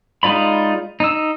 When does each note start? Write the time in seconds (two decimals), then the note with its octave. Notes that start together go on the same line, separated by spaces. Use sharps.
0.23 G#3 D#4 F4 D5 B5
1.00 D#4 E6